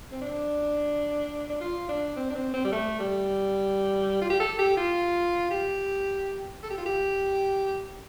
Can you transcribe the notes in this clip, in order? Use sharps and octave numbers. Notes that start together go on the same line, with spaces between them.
C4
D4
D4
F4
D4
C4
D4
C4
C4
G3
A3
G3
F4
G4
A4
G4
F4
G4
A4
G4
F4
G4